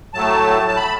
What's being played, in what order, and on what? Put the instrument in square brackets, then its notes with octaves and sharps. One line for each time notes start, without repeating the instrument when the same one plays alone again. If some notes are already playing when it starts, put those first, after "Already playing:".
[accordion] A2 F#3 A3 A5
A5
B5